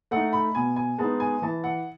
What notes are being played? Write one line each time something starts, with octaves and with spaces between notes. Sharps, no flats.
A3 D#4 F#5
B5
B2 G#5
G#5
G#3 B3 D#4 A5
G#5
E3 A5
F#5